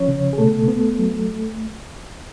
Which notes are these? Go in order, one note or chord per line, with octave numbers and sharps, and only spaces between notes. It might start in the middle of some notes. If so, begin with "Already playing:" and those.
Already playing: F3 C#4 C#5
C#3
G#4
B2 A3 A4
B3
F#3